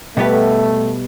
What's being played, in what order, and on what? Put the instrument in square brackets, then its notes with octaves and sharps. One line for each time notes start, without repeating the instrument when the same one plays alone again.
[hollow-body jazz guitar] B2 G3 B3 G4 B4 [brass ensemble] A3